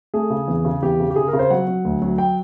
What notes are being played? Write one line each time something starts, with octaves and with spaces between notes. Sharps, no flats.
A3 G#4
C#3
E2
C#3
E2 G4
C#3
G4
C#3 G#4
A#4
C#3
C5
F#3 F#5
F#3
D2
F#3
G5